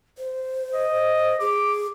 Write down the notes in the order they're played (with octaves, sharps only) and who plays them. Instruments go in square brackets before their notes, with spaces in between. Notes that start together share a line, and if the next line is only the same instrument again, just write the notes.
[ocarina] C5
[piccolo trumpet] D#5
[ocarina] G#4 [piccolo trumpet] D6